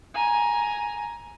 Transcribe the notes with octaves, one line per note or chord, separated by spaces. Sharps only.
G#5 A#5